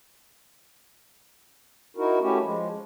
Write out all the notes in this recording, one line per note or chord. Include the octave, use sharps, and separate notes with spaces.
D#4 E4 F#4 A#4
A3 C#4 E4 F#4 G4
F3 G#3